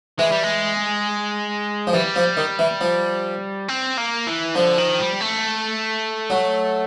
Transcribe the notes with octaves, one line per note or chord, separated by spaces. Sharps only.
E3 G#3
G3
G#3
F3
E3 G3
F3
D#3
E3
F3
C4
A#3
E3
D3 F3
D#3
G3
A3
F#3